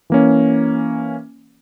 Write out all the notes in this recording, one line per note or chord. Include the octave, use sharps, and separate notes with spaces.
E3 A#3 C#4